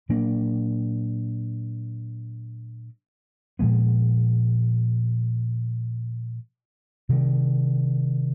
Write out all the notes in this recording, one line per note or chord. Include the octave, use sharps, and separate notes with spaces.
A#2 F#3 A#3 D4
A#2 F3 G#3 B3
C3 D#3 G3